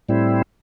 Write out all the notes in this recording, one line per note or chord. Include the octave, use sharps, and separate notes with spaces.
A2 G3 C4 E4